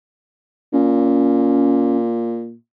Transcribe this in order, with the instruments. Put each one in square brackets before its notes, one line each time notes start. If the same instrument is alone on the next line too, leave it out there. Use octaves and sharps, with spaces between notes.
[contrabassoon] A#2 [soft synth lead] C#4